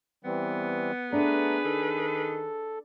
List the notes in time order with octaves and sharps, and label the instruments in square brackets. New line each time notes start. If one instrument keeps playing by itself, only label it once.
[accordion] E3 G3 C4 [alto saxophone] B3
[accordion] A3 A#5 [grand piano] D4 [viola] G#4 B4
[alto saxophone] D#3 [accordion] A4